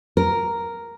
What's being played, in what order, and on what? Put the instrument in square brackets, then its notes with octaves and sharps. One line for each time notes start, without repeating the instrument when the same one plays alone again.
[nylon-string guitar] A#4